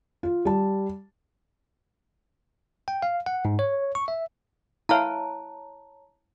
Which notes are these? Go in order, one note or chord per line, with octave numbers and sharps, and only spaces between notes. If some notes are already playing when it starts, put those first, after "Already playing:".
F4
G3 A5
G5
F5
F#5
G#2
C#5
C#6
E5
E4 C#5 F5 A5 A#5